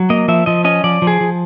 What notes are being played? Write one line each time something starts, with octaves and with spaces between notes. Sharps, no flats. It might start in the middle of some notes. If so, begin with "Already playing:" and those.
Already playing: F#3
A#3 D#5
F3 E5
F3 D#5
C#4 D#5
F3 D5
F3
G#4
F3